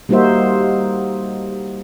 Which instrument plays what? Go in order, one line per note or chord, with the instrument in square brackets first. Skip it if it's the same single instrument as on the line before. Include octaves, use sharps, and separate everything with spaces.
[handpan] G3 A#3 D#4 F#4 C5 E5